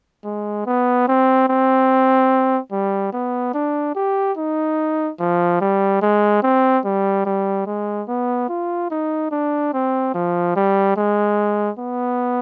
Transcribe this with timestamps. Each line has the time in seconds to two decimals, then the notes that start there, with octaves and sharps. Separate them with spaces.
0.24 G#3
0.66 B3
1.08 C4
1.49 C4
2.72 G3
3.13 B3
3.54 D4
3.95 G4
4.37 D#4
5.20 F3
5.61 G3
6.02 G#3
6.43 C4
6.85 G3
7.26 G3
7.66 G#3
8.08 B3
8.49 F4
8.91 D#4
9.31 D4
9.73 C4
10.14 F3
10.56 G3
10.97 G#3
11.79 B3